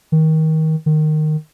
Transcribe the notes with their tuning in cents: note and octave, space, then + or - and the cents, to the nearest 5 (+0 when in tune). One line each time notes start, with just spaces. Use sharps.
D#3 +25
D#3 -15